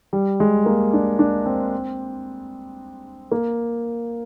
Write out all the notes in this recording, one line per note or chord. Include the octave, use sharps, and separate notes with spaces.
G3
G#3
A#3
D4
D4
C4
A#3